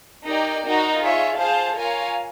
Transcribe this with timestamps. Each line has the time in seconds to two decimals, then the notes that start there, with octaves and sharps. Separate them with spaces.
0.26 D#4 G4 A#4 D5 G5
0.63 D#4 F#4 A#4
1.00 F4 G#4 C#5 E5
1.37 F4 G#4 C5 F5 A5
1.76 F4 A#4 C#5 F5 G#5